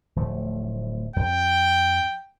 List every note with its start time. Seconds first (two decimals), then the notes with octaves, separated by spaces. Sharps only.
0.16 D1 F3 A3
1.16 F2 G5